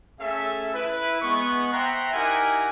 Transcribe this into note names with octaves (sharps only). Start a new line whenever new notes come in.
A3 C#4 G#4 A4 E5
E4 B4
G#3 B3 C#6
C5 E5 F#5 G5 A#5 C6
D#4 E4 G4 A#4 F#5 G#5